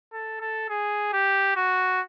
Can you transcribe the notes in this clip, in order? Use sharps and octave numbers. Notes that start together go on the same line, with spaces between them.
A4
A4
G#4
G4
F#4